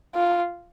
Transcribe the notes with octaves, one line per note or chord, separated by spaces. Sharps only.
F4